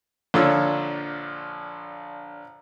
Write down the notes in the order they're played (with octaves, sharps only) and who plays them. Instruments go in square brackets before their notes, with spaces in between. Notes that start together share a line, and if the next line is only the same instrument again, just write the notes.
[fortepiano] A#1 D3 F3 D4 C#5 E6